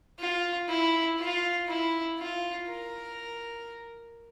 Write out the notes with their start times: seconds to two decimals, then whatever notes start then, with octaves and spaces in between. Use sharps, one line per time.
0.19 F4
0.69 E4
1.19 F4
1.68 E4
2.18 F4
2.68 A#4